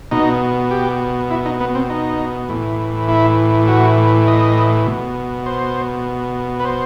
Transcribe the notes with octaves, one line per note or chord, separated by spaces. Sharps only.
B2 D#4
G4
E4
D#4
B3
C4
D#4
A2 E3
E4
F#4
D#5
B2
C5
B4
C5